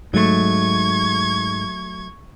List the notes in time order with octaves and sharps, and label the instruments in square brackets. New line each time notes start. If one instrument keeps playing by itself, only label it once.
[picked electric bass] G#2 [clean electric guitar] F#3 A3 [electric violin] C#6 G#6